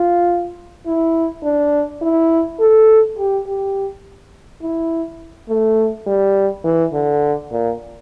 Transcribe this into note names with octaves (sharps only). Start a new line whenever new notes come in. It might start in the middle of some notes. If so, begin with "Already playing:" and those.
Already playing: F4
E4
D4
E4
A4
G4
G4
E4
A3
G3
E3
D3
A#2